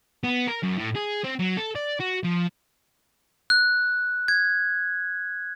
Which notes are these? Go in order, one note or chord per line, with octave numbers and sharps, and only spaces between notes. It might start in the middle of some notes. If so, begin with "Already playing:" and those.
B3
A#4
F#2
A2
G#4
C4
F#3
A4
D5
F#4
F3
F#6
G#6